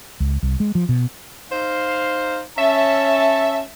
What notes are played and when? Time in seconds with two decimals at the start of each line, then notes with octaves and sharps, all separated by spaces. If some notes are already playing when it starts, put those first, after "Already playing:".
0.20 C#2
0.43 C2
0.60 G#3
0.75 F3
0.89 B2
1.50 D#4 C5 F5
2.58 C#4 E5 A5